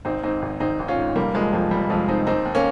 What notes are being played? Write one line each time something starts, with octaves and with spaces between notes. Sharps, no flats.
G#1 C4 D#4
G#2 C4 D#4
G#1
G#1 C4 D#4
G#1
C#4 F4
G#2
F1 G3 A#3
F1 F3 G#3
F2 F3
F1 G3
F2 F3 G#3
F1 C4 D#4
D#2 C4 D#4
D#2
A#3 C#4